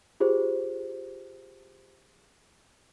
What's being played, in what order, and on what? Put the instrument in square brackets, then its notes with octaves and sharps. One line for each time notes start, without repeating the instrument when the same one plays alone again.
[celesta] F4 G4 G#4 C5